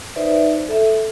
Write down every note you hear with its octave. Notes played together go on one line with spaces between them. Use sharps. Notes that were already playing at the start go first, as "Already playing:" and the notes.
D#4 B4 C5 D5 E5
A4 E5